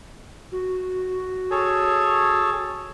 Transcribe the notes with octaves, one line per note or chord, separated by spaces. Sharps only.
F#4
G#4 A4 C#5